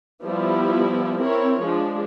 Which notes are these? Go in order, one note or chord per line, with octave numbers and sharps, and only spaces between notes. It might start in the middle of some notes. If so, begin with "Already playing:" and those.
F3 G3 B3 E4
C4 E4 A#4 C#5
F3 G#3 D4